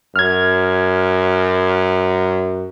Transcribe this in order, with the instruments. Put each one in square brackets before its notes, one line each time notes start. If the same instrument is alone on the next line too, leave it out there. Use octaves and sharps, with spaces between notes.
[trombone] F#2 [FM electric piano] F6 G#6